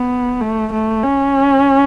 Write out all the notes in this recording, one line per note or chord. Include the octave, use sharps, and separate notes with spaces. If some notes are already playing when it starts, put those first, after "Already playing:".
Already playing: B3
A3
A3
C#4